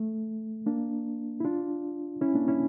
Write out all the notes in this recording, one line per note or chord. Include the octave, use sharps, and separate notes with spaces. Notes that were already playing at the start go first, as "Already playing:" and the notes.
Already playing: A3
A#3 D4
E4
D4 F4
C#4 E4
A#3 D4
C#4 E4